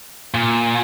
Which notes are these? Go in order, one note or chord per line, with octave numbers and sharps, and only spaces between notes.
A#2